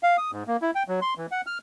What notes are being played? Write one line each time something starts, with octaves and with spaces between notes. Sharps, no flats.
F5
D#6
G#2
A#3
E4
G5
F#3
C6
E3
F#5
F6